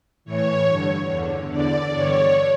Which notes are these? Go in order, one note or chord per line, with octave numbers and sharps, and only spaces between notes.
A2 E3 C#5
G2 D3
E2 D3
E2 D3 D5
G2 D3 C#5